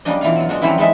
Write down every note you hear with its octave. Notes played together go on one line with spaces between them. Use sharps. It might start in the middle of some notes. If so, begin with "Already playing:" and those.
G3 A#3 C#4 D4 D#5
B2 E3 F4 F5
F#3 F4
G#3 D4 F#4
E3 F#3 G3 C4 C#4 E4
G#3 C#4 D#4 E4 E5